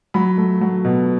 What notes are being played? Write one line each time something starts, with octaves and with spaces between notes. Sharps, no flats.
F#3 B5
A3
F#3
B2